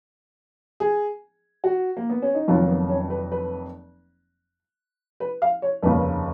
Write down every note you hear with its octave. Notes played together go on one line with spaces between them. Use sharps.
G#4
F#4
A#3
B3
C#4
D#4
F1 F2 D#3 F#3 A#3 F4
B3
C#4
B4
B4
B4
F5
C#5
F1 D#2 C#3 B4